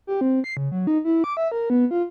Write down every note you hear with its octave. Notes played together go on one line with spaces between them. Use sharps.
G4
C4
C7
C#3
F#3
D#4
E4
D6
E5
A#4
B3
F4